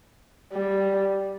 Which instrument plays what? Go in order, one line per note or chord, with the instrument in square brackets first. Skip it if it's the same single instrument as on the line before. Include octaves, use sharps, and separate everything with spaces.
[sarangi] G3